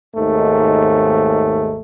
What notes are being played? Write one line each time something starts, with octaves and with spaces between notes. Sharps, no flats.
G#1 D#2 G#2 A3